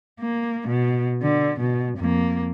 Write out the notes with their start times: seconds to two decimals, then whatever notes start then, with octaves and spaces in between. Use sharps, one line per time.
0.20 A#3
0.68 B2
1.23 D3
1.60 B2
1.98 F2 A#3